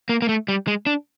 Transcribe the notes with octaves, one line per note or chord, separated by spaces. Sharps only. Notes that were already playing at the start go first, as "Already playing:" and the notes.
A#3
A#3
A3
G3
G#3
D4